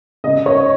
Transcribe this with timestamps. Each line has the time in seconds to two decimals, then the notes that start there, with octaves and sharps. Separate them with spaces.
0.24 C#3 D#5
0.46 C#5